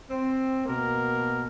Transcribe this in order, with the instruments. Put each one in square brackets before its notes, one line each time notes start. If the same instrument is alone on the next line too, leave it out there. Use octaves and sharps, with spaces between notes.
[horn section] C4
B2 A#3 A#4